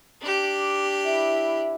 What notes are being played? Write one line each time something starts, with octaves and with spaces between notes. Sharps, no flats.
D4 G4
D6
E4 E5